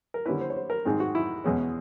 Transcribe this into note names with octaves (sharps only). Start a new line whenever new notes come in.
A#4
D3 G3 A#3 C#4 E4 B4
C5
C#5
C5
A#4
G#2 D#3 G#3 C4
F#4
E4
E2 B2 G#3 C#4